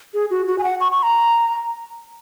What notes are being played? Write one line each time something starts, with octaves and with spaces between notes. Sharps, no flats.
G#4
F#4
F#4
G#5
F#5
C#6
C#6
A#5